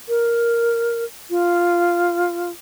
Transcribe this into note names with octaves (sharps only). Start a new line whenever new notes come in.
A#4
F4